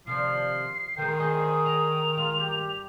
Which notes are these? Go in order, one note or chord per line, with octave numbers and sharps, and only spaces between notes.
C3 D#3 F3 D4 C7
D#3 E3 G#3 G5
C4 G#4 D#5
D#5 F7
G#3 F4
G2 G4